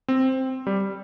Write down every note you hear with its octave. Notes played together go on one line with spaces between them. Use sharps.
C4
G3